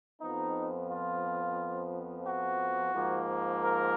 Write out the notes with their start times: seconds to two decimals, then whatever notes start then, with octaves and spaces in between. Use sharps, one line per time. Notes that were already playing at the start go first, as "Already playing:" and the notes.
0.21 F2 F3 B3 D#4
0.90 F4
2.27 F#4
2.94 G#2 F3 A#3
3.63 A#4